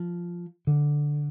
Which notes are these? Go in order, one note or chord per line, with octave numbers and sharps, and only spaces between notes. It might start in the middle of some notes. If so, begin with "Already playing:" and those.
Already playing: F3
D3